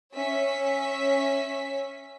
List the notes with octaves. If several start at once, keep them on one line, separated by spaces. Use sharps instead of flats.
C#4 E5 B6